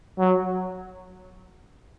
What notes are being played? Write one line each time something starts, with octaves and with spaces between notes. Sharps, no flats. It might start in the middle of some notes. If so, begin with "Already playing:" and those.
F#3